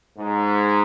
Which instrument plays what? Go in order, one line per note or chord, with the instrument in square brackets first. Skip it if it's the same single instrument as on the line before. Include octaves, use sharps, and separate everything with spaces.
[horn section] G#2